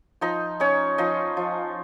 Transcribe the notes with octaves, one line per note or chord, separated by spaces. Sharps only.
F3 D#4 D#5
C#4 D#4 C#5
F3 D#4 D#5
F3